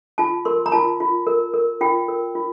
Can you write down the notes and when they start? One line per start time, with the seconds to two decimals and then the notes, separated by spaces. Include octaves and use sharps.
0.18 F4 A5
0.45 A#4 C6
0.66 A#5
0.72 F4 A5
1.00 F4
1.27 A#4
1.54 A#4
1.81 F4 G5
2.08 A#4
2.35 F4